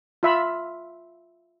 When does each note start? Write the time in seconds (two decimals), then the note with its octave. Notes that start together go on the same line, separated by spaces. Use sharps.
0.23 F4 E5 B5